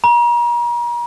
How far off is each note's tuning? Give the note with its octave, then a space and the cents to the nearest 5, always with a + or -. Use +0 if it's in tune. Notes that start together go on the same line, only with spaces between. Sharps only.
A#5 +40